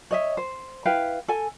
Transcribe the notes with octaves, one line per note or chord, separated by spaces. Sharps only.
C#5 D#5 E5
C5
E4 B4 F5 G5
A4 G#5